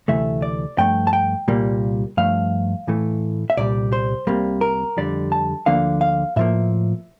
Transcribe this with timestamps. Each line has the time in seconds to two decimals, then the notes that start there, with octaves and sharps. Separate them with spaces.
0.08 D2 C3 E3 A3 E5
0.42 D5
0.78 G2 F3 A3 G5
1.07 A5
1.13 G5
1.48 C2 A#2 G3 A#3
2.17 G2 F3 A3 F5
2.87 A2 E3 A3
3.50 E5
3.57 C2 A#2 G3 D5
3.93 C5
4.27 C2 C3 G3 A#3
4.61 A#4
4.97 F2 D3 G3 D5
5.32 A5
5.66 D2 D3 F3 A#3 F5
6.01 F5
6.36 A2 F3 A#3 E5